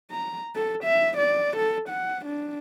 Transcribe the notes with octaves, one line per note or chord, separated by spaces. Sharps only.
A#5
A4
E5
D5
A4
F#5
D4